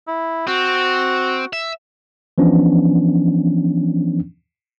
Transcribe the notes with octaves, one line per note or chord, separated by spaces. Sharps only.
E4
C4 F#4
E5
E3 F3 B3 C#4 D4